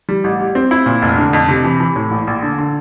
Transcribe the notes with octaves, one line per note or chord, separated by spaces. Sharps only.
G3
A1
G3
C4
E4
A#2
F1
D3
F2
C3
E3
E3
A2
A#1
A#1
D3
D3